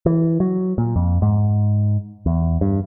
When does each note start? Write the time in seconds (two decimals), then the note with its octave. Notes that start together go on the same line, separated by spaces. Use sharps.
0.06 E3
0.40 F#3
0.78 A#2
0.96 F2
1.22 G#2
2.26 E2
2.61 G2